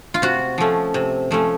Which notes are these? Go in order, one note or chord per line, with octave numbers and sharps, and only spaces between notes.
F4
C3 F#4
F3 A3 C#4
C3
F3 A3 C#4